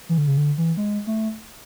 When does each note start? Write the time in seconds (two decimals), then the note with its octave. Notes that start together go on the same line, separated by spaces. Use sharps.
0.09 E3
0.18 D3
0.28 C#3
0.37 D3
0.58 E3
0.77 G#3
1.07 A3